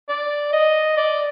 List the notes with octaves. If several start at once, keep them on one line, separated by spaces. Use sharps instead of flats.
D5
D#5
D5